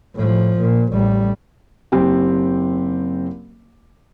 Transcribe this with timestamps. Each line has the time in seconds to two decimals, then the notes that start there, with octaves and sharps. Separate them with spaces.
0.15 A2 F3
0.61 A#2
0.93 A1 G3
1.92 F#1 C4 G4